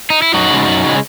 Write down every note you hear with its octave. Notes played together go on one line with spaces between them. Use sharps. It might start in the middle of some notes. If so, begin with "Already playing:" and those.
D#4
E4
F#2 D#4 F#4
C#3 G#3
F#2
C#3 G#3